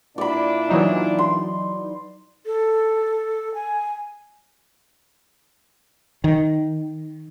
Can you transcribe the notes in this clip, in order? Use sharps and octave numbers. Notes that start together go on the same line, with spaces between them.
A#2 D4 E4 D5 B5
E3 F#3 D#4
C6
A4
G#5
D#3